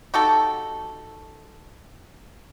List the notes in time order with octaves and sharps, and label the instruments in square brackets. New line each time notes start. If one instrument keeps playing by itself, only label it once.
[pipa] D#4 F#4 G4 A4